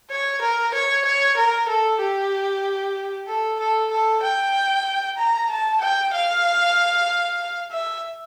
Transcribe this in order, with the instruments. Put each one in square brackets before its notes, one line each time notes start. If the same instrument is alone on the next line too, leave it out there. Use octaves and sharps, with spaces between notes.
[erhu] C#5
A#4
C#5
C#5
A#4
A4
G4
A4
A4
A4
G5
A#5
A5
G5
F5
E5